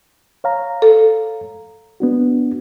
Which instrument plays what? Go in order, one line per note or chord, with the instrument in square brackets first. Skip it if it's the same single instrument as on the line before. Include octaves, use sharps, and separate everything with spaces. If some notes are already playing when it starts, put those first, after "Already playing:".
[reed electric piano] C#5 F5 A#5
[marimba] A4
[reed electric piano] B3 D4 F#4